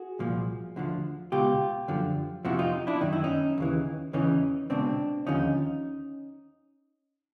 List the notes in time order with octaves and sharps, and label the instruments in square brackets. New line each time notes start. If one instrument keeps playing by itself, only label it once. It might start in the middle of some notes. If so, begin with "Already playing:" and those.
Already playing: [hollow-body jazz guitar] F#4 G#4
C2 A#2 F3
D2 D3 F3
C#2 B2 F4 G4
F#2 D3 F3
F2 C3 F3 E4 F#4
D#4 F4
D4 E4
F#2 D#3 D#4
E4
C#4 D#4
D#2 C#3 E3
E2 C#3 E3 C#4 D#4
C#2 B2 C4 D4
D#2 D3 F3 C#4 D#4